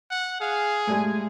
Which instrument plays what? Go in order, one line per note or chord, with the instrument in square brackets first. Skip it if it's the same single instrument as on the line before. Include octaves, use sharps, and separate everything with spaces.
[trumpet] F#5
[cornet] G#4 [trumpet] F5
[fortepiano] A2 G3 G#3 [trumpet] G#5